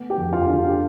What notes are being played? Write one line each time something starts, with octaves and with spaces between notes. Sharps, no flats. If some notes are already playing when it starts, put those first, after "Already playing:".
Already playing: A3 B3
G4 G5
F2
F4 F5
D3
G4